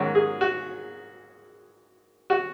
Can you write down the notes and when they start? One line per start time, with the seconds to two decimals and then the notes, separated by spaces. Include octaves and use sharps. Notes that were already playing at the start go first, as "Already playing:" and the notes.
Already playing: G#2 D#3 F#3 C#4 F#4
0.15 G#4
0.41 F#4
2.30 F#4